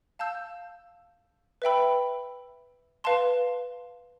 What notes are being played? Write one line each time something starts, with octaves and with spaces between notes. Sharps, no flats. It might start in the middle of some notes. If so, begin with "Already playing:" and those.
F5 A5 E6 G6
B4 E5 G5 B5 E6
B4 F5 A5 C6